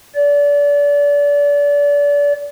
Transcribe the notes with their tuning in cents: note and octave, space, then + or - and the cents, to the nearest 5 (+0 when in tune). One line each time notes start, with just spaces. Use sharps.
D5 -30